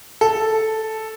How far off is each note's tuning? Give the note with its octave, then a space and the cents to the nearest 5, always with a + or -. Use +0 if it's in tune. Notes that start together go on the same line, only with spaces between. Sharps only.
A4 -5